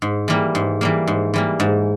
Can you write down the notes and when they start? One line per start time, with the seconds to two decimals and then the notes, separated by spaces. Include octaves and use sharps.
0.02 G#2
0.28 E3 G3 A#3
0.55 G#2
0.81 E3 G3 A#3
1.07 G#2
1.34 E3 G3 A#3
1.60 G#2